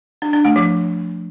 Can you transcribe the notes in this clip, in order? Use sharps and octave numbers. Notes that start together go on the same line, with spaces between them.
D4
D4
A3
F3